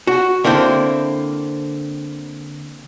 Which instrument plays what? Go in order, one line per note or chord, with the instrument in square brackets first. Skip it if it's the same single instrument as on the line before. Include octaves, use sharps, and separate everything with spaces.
[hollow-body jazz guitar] F#4
D3 A#3 C4 E4 C5